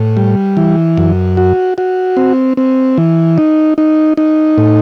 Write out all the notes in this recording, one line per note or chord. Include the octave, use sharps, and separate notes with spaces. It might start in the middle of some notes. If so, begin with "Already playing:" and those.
Already playing: A2
G3
E3
F#2
F#4
F#4
C4
C4
E3
D#4
D#4
D#4
A2